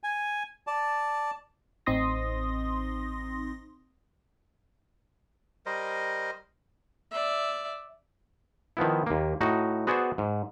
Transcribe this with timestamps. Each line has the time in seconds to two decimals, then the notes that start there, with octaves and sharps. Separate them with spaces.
0.03 G#5
0.67 D5 A5
1.86 A1 C4 D#4 C6 D#6 A#6
5.66 G3 A#4 C5 D#5
7.11 D5 E5
8.77 D#3 F3 B3 E4
9.06 D#2 A#3
9.41 A2 D#4 F#4
9.87 B3 F#4 G#4 C5 D5 G#5
10.18 G#2